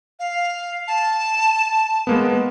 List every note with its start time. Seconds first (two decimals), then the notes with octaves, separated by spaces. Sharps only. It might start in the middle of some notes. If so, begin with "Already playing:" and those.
0.19 F5
0.88 A5
2.07 G#3 A#3 B3